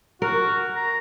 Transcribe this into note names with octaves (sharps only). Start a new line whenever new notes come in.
F#4 A#4
A#5